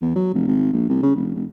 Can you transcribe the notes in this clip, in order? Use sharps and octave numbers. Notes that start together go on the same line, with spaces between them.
E2
F#3
F1
G#1
A#1
C2
C#3
F1
F1